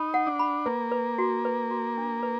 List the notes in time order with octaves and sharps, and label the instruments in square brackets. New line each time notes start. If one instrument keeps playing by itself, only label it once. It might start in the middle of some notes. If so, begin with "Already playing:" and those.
Already playing: [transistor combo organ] D#4 [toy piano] B5
[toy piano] F#5
[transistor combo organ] D4
[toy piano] B5
[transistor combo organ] A#3 [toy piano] B4
[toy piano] B4
F#4
B4
F#4
D4
B4